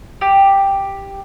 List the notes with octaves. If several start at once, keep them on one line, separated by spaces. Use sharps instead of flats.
G4